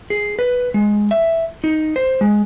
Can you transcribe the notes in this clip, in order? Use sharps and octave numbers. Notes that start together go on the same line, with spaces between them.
G#4
B4
G#3
E5
D#4
C5
G#3